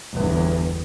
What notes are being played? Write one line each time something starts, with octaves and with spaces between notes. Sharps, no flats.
G1 E2